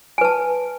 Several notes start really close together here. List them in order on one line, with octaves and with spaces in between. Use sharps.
G#5 B4 A5